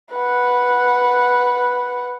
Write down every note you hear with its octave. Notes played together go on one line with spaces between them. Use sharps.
B4 F#5